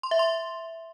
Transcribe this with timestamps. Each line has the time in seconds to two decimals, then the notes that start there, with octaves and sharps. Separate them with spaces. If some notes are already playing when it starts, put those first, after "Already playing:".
0.03 C6
0.11 E5
0.19 C6